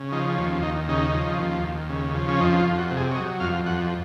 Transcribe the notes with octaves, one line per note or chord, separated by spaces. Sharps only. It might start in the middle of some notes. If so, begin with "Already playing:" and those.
Already playing: C#3
F3 D#4
D#2 C#4
D#2 D#4
C#3 D#4
F3
D#2
D#2
C#3
F3
C#4
F2 D#4
F4
F2
F#4
C3
G#4
C#5
F#3 D#5
F2 F5
F2 F#5